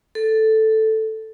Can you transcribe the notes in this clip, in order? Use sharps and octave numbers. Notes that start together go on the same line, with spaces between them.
A4